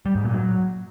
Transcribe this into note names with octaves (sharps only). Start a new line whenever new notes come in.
G3
G#2
A#2
F#3